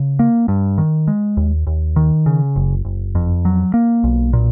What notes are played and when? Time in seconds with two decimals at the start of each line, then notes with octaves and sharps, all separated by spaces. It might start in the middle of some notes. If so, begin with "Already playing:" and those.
Already playing: C#3
0.19 A#3
0.48 G2
0.78 D#3
1.08 G#3
1.37 D#2
1.67 D#2
1.96 D#3
2.26 C#3
2.56 F#1
2.85 F#1
3.15 F2
3.45 F#3
3.74 A#3
4.04 B1
4.33 A#2